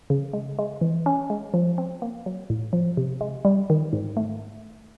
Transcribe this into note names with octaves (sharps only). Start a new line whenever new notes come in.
C#3
G#3
G#3
E3
C#4
G#3
F3
C4
A#3
F#3
A2
F3
C3
G#3
G3
D#3
G#2
A3